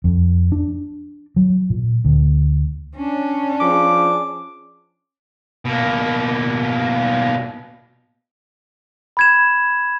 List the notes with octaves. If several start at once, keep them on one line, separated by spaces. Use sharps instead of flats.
F2
D4
F#3
A#2
D2
C#4 D4
F3 G#4 D6
B2 A#3
B5 G#6 E7